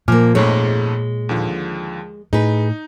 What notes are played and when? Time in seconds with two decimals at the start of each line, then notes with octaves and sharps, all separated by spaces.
0.08 A#2 F3 A#3 G#5 D6 F6
0.35 F2 G#2 G#3 A3 C#5
1.29 D#2 D3 F3
2.33 A2 D#4 G#4 B4